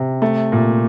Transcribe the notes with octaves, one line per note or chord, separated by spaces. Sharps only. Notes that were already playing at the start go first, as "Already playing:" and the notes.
Already playing: C3
A3
A#2